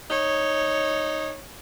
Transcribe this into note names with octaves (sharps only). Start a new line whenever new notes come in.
D#4 C#5